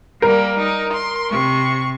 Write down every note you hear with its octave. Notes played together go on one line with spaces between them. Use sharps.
G3 A#3 A#4
D#4
C6
C3 C#6